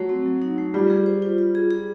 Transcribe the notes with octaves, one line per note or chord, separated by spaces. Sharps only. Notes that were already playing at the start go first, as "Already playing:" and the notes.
Already playing: F#3 A3
C4
F#3
D#4
A3
G3 F4
G#4
C5
F4
F4
G#4
G#4